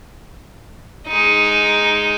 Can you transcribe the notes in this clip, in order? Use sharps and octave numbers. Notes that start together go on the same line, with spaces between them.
G#3 D#4